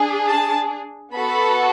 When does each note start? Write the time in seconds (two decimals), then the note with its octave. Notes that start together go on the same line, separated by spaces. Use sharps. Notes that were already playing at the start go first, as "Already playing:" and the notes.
Already playing: D4 G#4
0.26 A5
1.13 B3 F#4 A4 B5